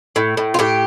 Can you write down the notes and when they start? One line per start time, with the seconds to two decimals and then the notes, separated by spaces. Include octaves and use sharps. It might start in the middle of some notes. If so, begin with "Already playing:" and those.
0.16 A2
0.37 A2
0.54 F4
0.59 A2 G4